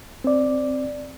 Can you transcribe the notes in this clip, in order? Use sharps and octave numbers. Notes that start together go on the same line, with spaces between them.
C4 D5